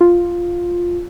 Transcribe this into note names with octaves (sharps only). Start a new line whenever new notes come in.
F4